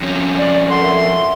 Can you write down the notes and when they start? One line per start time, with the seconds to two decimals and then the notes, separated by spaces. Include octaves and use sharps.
0.01 F2 C#4
0.38 D5
0.70 A4 F#5 C6
0.82 A#4 E5